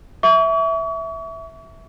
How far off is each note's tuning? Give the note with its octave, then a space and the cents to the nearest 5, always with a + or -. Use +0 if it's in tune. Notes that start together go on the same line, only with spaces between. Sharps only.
E5 -5 C#6 +40